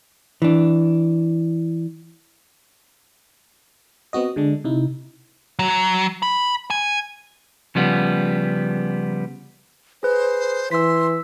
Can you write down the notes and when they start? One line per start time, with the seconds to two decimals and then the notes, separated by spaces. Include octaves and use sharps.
0.42 E3 D4
4.13 B3 C4 F#4 D#5
4.36 D3 G#3 D4
4.64 C3 D#4 E4
5.59 F#3
6.22 B5
6.70 G#5
7.75 C#3 F3 G3 B3
10.03 G#4 B4 C5
10.71 E3 C6 E6 B6